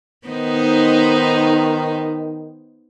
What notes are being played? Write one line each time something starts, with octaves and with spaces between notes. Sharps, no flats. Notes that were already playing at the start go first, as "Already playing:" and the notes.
D#3 B3 D#4 C5